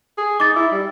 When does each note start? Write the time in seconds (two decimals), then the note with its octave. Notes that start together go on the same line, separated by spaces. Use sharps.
0.18 G#4
0.40 D#4 D6 A6
0.56 E4
0.72 G3